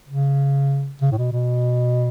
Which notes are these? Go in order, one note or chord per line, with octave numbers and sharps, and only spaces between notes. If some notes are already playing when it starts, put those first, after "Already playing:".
C#3
C#3
A2
B2
B2